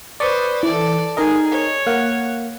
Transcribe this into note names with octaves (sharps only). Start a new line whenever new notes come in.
B4 C5 D5 C#6 D#6
E3 A4 D5
D#4 G#4 A#4 D#5
C#5
A#3 F5 F#5